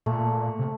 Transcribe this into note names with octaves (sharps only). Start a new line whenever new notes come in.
A#2 A3
C3